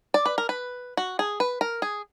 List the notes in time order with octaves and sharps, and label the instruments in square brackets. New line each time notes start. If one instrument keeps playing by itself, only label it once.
[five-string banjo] D5
B4
A#4
B4
F#4
G#4
B4
A#4
G#4